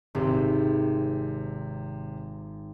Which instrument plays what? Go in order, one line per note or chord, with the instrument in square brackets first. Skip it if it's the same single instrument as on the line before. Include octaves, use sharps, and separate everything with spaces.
[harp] G#1 [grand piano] C3